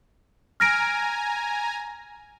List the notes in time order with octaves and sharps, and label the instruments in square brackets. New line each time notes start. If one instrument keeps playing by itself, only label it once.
[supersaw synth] G#5 A#5 [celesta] F6 A#6 D7